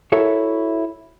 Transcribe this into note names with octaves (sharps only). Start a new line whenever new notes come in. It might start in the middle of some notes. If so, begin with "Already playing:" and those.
E4 F#4 A4 A#4 C#5 E5